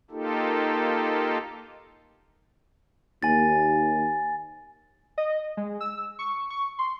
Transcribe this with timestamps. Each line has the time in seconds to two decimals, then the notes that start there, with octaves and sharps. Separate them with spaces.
0.11 A#3 D#4 F4 G4 A4
3.23 D#2 G#5 A6
5.18 D#5
5.57 G#3
5.81 E6
6.19 C#6
6.50 C#6
6.79 C6